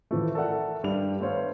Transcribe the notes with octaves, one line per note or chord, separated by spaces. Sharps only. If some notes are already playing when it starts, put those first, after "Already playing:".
A2 E3 F3 A3
A4 A#4 D5 E5 F#5
G2 G3 F7
A3 B3 C5 C#5 F5